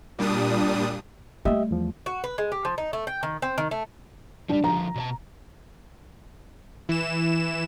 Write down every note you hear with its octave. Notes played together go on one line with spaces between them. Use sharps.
A#2 G3 D4 D#6
G3 A3 G4 D#5 E5
E2 F3
F#4
B4
G#3
G4
F3
D#4
A3
G5
D#3
C4
D#3
A3
F3 G3 D4
D3 F3 A#5
B2 C#5 A5
E3 E7